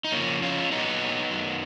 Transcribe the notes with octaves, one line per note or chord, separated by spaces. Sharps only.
D#4
F2 C#3 F3 A#3 C#4
C#4 F4
A#2 F#3 B3 D#4
F#2 D#3 F#3